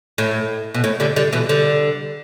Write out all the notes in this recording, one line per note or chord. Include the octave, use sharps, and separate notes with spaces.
A2
B2
A2
D3 G3
D3 G3
B2 E3
D3 G3